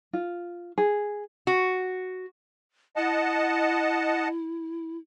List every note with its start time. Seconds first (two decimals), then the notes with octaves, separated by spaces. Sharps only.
0.13 F4
0.78 G#4
1.47 F#4
2.96 E4 D#5 F#5 A5